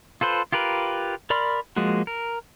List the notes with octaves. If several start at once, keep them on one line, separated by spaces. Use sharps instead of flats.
F4 A4 B4 C5
F4 G4 A#4 B4
A#4 D5 B5 C6 F6
F3 G#3 A#3 F#4
A#4